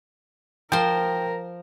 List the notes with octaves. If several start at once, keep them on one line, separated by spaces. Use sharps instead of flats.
F3 A#4 C5 G5